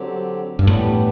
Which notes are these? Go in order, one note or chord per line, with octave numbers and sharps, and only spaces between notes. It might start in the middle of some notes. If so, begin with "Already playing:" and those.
Already playing: D3 F#3 C4 G4
G2
A2 E3 B3 D4 G4